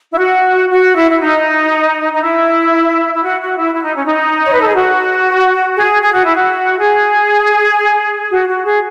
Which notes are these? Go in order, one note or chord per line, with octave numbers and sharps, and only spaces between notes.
E4
F#4
F#4
E4
E4
D#4
D#4
E4
E4
F#4
F#4
E4
E4
D#4
C#4
D#4
C#5
B4
A4
G#4
F#4
G#4
G#4
F#4
E4
F#4
G#4
F#4
F#4
G#4